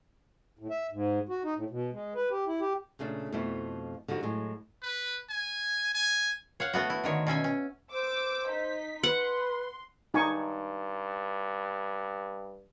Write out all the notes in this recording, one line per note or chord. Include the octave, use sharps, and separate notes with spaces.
A2
E5
G#2
F#4
D#4
A2
B2
G#3
B4
G4
E4
G4
A#2 C#3 A3 D4
F2 B2 F3 A3 E4
D3 F3 D#4 F#4 G4
A2 F#3 G#3
B4
G#5
G#5
C#5 F5 F#5
A3 B3 F#4
E4
D3 D#3 C#5
B2 C#4 E5 G#5
C#4
C5 D6 E6 D7
D#4 B6
B4 F#5 C6
G2 D#4 G#5 C#6